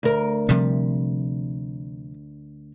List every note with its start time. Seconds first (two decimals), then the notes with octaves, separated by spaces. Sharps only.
0.03 D2 A#4
0.49 C3 F3 G3